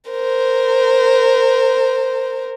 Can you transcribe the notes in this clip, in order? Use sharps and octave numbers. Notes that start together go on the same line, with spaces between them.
A#4 C5